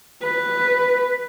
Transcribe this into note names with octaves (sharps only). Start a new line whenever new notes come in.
B4